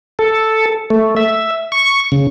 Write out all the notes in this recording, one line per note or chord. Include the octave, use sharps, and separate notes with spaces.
A4
A3
E5
C#6
C#3